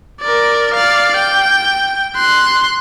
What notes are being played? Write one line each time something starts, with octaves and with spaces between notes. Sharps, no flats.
A#4 D5
D5 F5
G5
C6 F#6